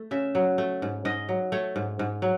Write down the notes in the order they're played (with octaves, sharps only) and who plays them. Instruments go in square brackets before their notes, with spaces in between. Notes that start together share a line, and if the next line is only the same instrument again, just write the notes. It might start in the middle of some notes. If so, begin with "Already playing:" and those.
Already playing: [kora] A3
C#3 E5
F#3
A3
G#2
G#2 D#5
F#3
A3 C#5
G#2
G#2
F#3